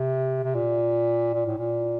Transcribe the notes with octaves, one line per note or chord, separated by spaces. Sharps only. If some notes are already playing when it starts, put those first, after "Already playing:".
Already playing: C3
C3
A#2
A#2
A2
A#2